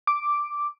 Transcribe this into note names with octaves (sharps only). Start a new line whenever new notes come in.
D6